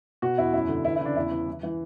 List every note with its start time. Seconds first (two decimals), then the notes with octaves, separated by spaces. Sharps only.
0.22 B2 F#4
0.38 E2 E4
0.53 F#2 E4
0.69 D3
0.85 E3 E4
0.96 E4
1.01 C#3 D4
1.16 E2 E4
1.31 E3
1.48 E3
1.63 E3